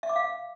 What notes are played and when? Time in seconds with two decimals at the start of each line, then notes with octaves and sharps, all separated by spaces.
0.03 E5
0.09 D6
0.16 F5